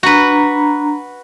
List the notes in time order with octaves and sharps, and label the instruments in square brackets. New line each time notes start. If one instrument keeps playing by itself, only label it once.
[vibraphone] D4 A#5 B5 [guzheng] F#4 B4